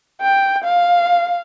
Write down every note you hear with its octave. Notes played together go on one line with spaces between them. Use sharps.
G5
F5